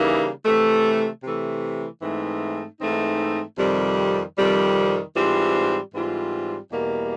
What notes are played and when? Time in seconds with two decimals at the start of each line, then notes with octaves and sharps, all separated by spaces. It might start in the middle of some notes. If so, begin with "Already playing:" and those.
Already playing: C#3 E3 G3 A#3 D#4
0.45 C3 E3 A3
1.23 C3 E3 A3
2.02 G#2 E3 A3 C4 D#4
2.80 G#2 E3 A3 C4 D#4
3.58 F2 C3 D#3 G3
4.37 F2 C3 D#3 G3
5.15 G#2 E3 G3 C4 F4
5.94 G#2 E3 G3 C4 F4
6.72 E2 B2 G3 A#3